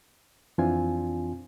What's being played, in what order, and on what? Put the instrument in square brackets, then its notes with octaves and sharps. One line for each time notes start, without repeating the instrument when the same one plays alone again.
[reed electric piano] F2 E3 C4 D4 F4 G#5